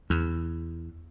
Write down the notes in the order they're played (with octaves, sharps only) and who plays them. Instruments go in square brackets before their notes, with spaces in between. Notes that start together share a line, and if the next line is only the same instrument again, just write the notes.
[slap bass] E2